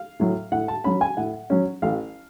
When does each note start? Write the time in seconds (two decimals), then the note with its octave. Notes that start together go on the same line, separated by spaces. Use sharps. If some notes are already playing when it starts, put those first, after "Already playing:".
Already playing: F5
0.20 A2 F#3
0.52 A2 F#5
0.68 A5
0.84 F#3 C#4 B5
1.01 G#5
1.17 A2 F#5
1.50 F#3 C#4
1.82 A1 F5